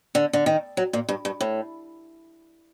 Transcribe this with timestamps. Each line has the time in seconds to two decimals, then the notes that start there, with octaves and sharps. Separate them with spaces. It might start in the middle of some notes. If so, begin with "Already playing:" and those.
0.15 D3
0.33 D3
0.46 D#3
0.77 F#3
0.93 A#2
1.09 G2
1.25 G2
1.41 A2